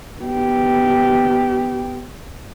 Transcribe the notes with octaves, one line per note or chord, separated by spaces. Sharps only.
B3 G4